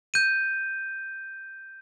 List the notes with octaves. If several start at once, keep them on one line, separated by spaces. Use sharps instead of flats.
G6 D#7